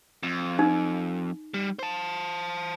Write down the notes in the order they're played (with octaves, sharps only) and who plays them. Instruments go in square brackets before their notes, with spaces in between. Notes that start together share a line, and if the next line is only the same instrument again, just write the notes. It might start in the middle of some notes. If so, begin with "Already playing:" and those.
[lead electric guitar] F2
[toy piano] D#4
[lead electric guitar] G3
C5 A5